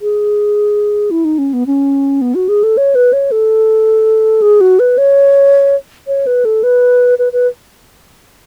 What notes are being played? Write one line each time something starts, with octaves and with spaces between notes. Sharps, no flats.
G#4
E4
D#4
C#4
B3
C#4
B3
F#4
G#4
A4
C#5
B4
C#5
A4
G#4
F#4
B4
C#5
C#5
B4
A4
B4
B4
B4